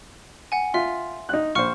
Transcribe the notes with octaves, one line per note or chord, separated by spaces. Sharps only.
F#5 G#5
F4 E5 C6
D#4 F#6
A#1 C5 C#6 F6 C#7